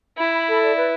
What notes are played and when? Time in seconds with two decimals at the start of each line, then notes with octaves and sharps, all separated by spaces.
0.17 E4 B5
0.33 B5
0.47 A4
0.62 D5
0.76 B4